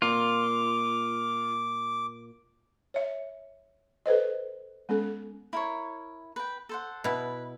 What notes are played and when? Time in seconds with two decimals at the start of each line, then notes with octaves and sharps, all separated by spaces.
0.02 A#2 F4 D6
2.94 C#5 E5
4.06 A4 B4 C5 D#5
4.89 G#3 B3 C#4 A4
5.53 E4 A#4 C#5
6.36 B4 G5
6.69 A4 C5 F#5
7.04 B2 E4 B4